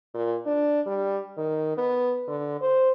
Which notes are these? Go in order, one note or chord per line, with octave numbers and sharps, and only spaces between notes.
A#2
D4
G3
D#3
B3
D3
C5